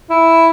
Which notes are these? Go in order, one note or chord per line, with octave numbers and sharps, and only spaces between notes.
E4